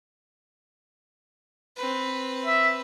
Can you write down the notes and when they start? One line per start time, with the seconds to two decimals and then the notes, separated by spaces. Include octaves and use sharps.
1.77 C4 B4
2.46 E5